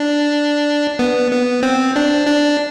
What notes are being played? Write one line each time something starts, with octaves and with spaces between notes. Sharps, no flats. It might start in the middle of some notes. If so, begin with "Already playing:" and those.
Already playing: D4
B3
B3
C4
D4
D4